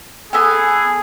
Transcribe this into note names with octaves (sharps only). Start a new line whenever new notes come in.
B3 G#4 A4 G#5